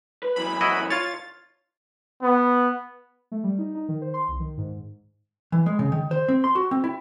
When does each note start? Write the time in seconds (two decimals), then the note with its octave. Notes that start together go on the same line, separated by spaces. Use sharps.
0.23 B4
0.36 F#2 E3 B5
0.61 E4 F#4 D#5
0.90 F4 C#5 A6
2.22 B3
3.32 A3
3.44 G3
3.58 D#4
3.75 D#4
3.89 D#3
4.02 C5
4.14 C6
4.28 C2
4.40 D#3
4.58 G#2
5.52 E3
5.66 G#3
5.79 C#3
5.92 D#3
6.11 C5
6.28 C4
6.44 C6
6.55 F#4
6.71 C4
6.84 E4